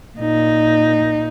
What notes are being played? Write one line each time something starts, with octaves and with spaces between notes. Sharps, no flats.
A#2 D#4